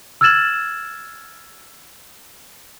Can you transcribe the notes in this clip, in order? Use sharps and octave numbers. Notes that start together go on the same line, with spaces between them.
E6 F6 G#6 A6 E7 F#7